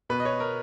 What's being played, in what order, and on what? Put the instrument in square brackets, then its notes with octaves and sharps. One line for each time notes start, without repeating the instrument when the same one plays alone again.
[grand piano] B2 B4
D#5
C#5
A#4